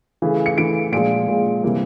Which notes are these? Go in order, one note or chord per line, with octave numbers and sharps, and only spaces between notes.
C#3 E3 A3
C#7
C#3 E3 A3 D7
A#2 F3 G#3 D7
A#2 F3 G#3
C3 E3 G3 A#3